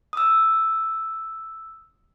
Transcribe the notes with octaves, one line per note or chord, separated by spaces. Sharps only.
D#6 E6